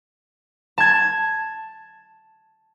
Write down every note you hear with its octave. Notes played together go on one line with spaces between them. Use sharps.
A5 G#6